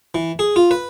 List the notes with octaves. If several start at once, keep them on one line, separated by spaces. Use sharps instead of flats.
E3
G#4
F4
B4